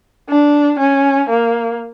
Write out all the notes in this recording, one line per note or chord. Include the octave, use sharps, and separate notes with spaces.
D4
C#4
A#3